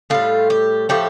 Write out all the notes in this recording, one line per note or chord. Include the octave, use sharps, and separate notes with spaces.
A2 G3 F4
G4
A2 F3 A3 G4